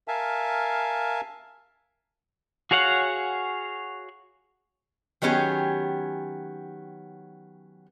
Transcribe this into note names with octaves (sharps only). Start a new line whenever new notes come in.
A#4 E5 F5 G#5 A5
F#4 G#4 C#5 F5 F#5
D#3 F#3 B3 C#4 G4 G#4